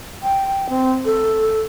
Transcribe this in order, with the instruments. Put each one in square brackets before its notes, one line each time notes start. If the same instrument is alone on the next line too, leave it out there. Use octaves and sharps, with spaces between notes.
[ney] G5
C4
A4